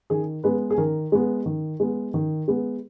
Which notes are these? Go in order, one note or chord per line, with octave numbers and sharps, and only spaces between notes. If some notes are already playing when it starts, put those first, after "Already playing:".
D#3 G#4
G#3 B3 B4
G#4
D#3 A#4
G#3 B3
D#3
G#3 B3
D#3
G#3 B3